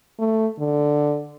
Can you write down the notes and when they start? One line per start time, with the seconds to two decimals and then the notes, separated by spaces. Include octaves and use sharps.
0.19 A3
0.59 D3